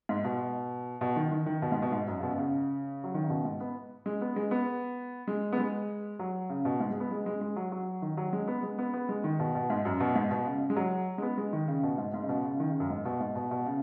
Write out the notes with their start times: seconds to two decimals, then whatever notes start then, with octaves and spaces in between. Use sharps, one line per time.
0.09 G#2
0.25 B2
1.01 B2
1.16 D#3
1.31 D#3
1.46 D#3
1.62 B2
1.72 G#2
1.82 B2
1.92 G#2
2.07 F#2
2.19 C#3
2.23 B2
2.34 B2
2.38 C#3
3.04 F#3
3.14 D#3
3.23 C#3
3.30 B2
3.45 G#2
3.60 B3
4.06 G#3
4.21 B3
4.36 G#3
4.51 B3
5.27 G#3
5.53 B3
5.58 G#3
6.19 F#3
6.49 C#3
6.65 B2
6.80 G#2
6.90 G#3
7.00 B3
7.11 G#3
7.26 G#3
7.41 G#3
7.56 F#3
7.72 F#3
8.02 D#3
8.17 F#3
8.33 G#3
8.48 B3
8.63 G#3
8.79 B3
8.94 B3
9.09 G#3
9.24 D#3
9.39 B2
9.55 B2
9.70 G#2
9.85 F#2
10.00 B2
10.16 G#2
10.31 B2
10.46 C#3
10.70 G#3
10.76 F#3
11.18 G#3
11.22 B3
11.37 G#3
11.53 D#3
11.68 C#3
11.83 B2
11.98 G#2
12.14 G#2
12.22 C#3
12.29 B2
12.44 C#3
12.60 D#3
12.70 C#3
12.80 F#2
12.90 G#2
13.05 B2
13.21 G#2
13.35 B2
13.51 B2
13.66 C#3